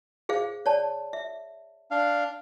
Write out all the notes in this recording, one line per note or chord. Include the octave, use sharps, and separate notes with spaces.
G#4 C5 F5
C#5 D5 A5
E5
D4 F5